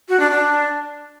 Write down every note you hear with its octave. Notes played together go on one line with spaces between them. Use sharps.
F#4
D4
D4